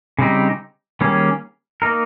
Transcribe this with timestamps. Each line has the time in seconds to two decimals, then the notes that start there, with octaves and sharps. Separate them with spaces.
0.19 C#3 G3 C4 D#4 G4
1.01 D#3 G3 A#3 C#4 G#4
1.82 A#3 D#4 A#4